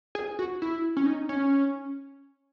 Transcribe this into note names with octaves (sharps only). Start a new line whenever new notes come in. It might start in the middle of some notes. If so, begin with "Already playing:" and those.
G#4
F#4
E4
C#4
D#4
C#4